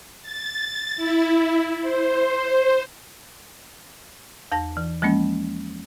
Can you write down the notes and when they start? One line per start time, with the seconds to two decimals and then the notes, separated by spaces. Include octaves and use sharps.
0.22 A6
0.97 E4
1.82 C5
4.52 E2 A5 A#6
4.77 E3
5.02 F3 G#3 A#3 C#4